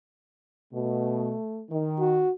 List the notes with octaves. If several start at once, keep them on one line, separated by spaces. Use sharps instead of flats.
B2 A3
D#3
F#4